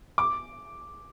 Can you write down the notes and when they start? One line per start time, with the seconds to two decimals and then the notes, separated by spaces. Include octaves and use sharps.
0.18 D6